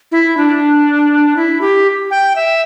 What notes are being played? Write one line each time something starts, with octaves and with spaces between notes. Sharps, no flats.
E4
D4
E4
G4
G5
E5